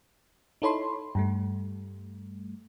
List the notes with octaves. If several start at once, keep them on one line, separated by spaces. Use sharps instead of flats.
D#4 E4 A4 C#5 B5 C6
G2 G3 A3